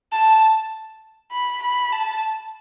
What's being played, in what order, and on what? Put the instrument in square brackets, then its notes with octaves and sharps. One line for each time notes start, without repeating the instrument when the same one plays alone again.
[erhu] A5
B5
B5
A5